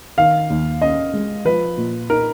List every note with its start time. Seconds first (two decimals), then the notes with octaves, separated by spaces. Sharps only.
0.17 D#3 F5
0.50 D#2
0.81 C#4 D#5
1.13 G#3
1.45 F3 B4
1.77 A#2
2.09 D#4 A#4